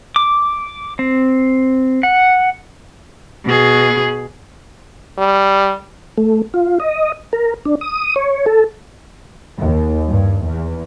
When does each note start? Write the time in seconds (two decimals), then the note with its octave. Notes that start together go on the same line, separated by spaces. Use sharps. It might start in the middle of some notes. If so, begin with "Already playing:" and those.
0.16 D6
0.99 C4
2.03 F#5
3.45 B2 G#4
5.18 G3
6.18 A3
6.54 F4
6.80 D#5
7.33 A#4
7.65 D4
7.81 D#6
8.16 C#5
8.46 A4
9.59 D#2
10.09 G2
10.45 E2